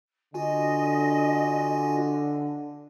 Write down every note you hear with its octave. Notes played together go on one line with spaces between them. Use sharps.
D3 F4 F#4 D#5 G#5